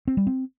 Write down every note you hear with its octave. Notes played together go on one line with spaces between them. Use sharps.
C4
G3
C4